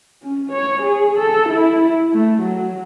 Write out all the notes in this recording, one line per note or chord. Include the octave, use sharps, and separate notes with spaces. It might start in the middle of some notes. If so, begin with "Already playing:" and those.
C#4
C#5
G#4
A4
E4
A3
F#3